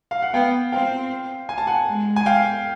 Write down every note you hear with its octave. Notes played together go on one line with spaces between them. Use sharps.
F5
F#5
B3 F5 G5
C4 F5 G5
G#5
A5
F#5 G#5
G#3
G#5
F5 G5